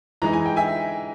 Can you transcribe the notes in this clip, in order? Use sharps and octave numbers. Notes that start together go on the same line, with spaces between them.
E3 G#3 D#4 A#5
G#5
G5
E5 G#5